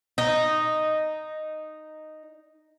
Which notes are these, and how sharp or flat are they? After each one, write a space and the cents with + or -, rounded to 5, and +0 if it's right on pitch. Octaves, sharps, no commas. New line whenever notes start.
D#4 -5